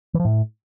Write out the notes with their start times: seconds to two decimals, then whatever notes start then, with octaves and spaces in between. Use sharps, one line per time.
0.14 E3
0.20 F3
0.25 A2